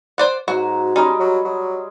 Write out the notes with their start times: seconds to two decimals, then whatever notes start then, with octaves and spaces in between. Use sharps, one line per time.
0.18 C5 D5 F#5
0.48 G#2 F#3 F#4 A#5
0.96 G3 G#3 C#4 D#4 D#5
1.20 F#3
1.45 F#3